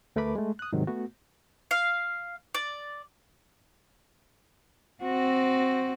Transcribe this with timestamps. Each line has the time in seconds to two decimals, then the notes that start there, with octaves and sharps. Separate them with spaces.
0.16 D2 A3 A#4 B4 B5 D6
0.36 G#3 A3
0.59 D#6 F#6
0.73 G#2 C3 D#3 F#3
0.87 A3 B3 F#4
1.71 F5
2.54 D5
5.04 C4 F#4